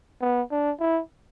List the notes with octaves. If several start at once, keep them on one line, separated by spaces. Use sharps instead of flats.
B3
D4
E4